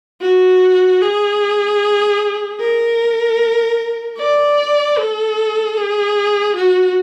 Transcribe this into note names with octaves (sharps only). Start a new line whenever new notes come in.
F#4
G#4
A#4
D5
A4
G#4
F#4